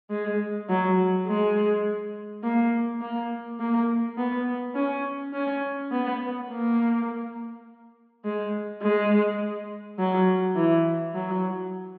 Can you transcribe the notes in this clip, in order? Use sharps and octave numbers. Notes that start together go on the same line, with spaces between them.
G#3
F#3
G#3
A#3
A#3
A#3
B3
C#4
C#4
B3
A#3
G#3
G#3
F#3
E3
F#3